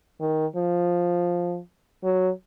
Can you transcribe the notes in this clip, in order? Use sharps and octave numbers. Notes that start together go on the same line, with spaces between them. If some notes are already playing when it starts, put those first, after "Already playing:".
D#3
F3
F#3